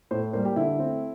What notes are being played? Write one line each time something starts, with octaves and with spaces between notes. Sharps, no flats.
A2 C5
G3 A#3 C5
G4
D3 E4
A3 C4